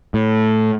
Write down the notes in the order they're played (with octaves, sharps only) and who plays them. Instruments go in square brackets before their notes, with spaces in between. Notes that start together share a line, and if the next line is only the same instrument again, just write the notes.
[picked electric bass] A2